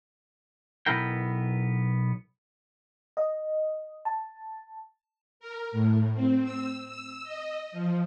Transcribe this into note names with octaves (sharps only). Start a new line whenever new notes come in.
B1 E2 B3 E4 A#4 G5
D#5
A5
A#4
A2
C4
E6
E6
D#5
F3